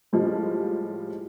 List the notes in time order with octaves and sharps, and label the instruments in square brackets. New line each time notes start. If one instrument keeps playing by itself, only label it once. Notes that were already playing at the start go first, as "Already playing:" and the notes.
[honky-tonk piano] A2 F3 G3 G#3